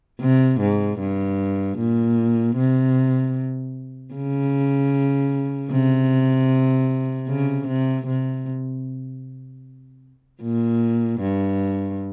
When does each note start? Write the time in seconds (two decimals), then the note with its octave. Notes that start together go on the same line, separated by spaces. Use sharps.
0.21 C3
0.61 G#2
1.00 G2
1.79 A#2
2.57 C3
4.15 C#3
5.72 C3
7.29 C#3
7.68 C3
8.07 C3
10.43 A#2
11.21 G2